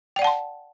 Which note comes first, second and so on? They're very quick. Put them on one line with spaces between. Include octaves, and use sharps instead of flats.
G5 D5 F#5 A5 C6